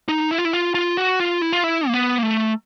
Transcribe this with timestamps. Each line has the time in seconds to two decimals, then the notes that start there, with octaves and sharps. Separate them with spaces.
0.09 D#4
0.31 E4
0.39 F4
0.45 E4
0.53 F4
0.75 F4
0.97 F#4
1.20 F4
1.41 E4
1.53 F4
1.64 E4
1.88 A#3
1.94 B3
2.18 A#3
2.23 A3